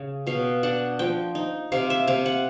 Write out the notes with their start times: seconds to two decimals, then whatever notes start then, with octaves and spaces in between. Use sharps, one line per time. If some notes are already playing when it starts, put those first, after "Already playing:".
Already playing: C#3
0.27 B2 F5
0.63 D4 F#5
0.99 F3 G5
1.35 D#4
1.72 C3 F5
1.90 E5
2.07 C3 F5
2.26 F#5